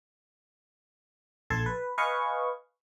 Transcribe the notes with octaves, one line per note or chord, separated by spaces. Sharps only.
A#1 A4 A5 C6 G#6
B4
B4 D#5 F5 G#5 C#6